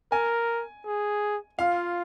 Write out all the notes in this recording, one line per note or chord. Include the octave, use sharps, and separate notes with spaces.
A#4 G#5
G#4
F4 F5